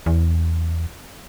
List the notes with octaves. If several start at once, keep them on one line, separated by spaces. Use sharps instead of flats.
E2